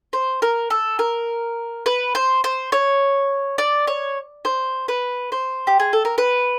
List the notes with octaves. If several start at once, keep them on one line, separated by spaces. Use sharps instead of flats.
C5
A#4
A4
A#4
B4
C5
C5
C#5
D5
C#5
C5
B4
C5
G4
G#4
A4
A#4
B4